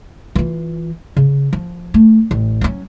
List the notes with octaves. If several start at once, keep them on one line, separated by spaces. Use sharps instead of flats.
E3 F4
C#3
F3
A3
A1
F#3 C#4